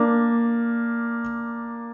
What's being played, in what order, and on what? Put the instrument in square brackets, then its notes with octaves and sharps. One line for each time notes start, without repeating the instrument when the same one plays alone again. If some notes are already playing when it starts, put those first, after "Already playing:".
Already playing: [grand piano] A#3 D4